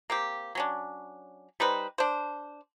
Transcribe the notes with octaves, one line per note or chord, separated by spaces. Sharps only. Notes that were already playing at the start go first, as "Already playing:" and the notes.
A#3 C4 G4
F#3 C#4 D4
G3 D#4 B4 C5
D4 C5